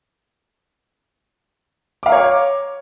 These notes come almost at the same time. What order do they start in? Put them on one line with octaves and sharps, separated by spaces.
D6 F5 A#5 C#5